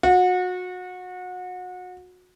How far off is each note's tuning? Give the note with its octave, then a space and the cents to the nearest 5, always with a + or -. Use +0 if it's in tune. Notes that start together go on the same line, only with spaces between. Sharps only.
F#4 -30